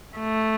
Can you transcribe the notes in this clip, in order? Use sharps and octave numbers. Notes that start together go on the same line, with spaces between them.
A3